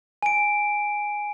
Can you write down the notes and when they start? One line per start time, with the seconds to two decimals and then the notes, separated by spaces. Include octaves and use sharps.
0.22 G#5 D7